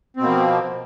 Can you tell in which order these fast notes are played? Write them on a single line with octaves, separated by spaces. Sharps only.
C4 B2 A#3 F3